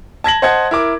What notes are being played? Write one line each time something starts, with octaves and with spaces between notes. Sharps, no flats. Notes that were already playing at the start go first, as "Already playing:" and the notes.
A5 G#6 A#6 F#7
C5 D#5 F#5 A5 G#6
E4 A#4 D6